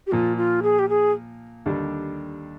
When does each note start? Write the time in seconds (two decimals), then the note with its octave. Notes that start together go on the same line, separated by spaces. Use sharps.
0.07 G4
0.12 A#2 F3 A#3 F4
0.37 F4
0.63 G#4
0.79 G4
0.89 G#4
1.66 D#2 D3 G3 D4